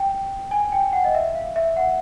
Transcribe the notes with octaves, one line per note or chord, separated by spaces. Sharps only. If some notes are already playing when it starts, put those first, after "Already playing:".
Already playing: G5
G#5
G5
F#5
D#5
E5
F5
E5
F#5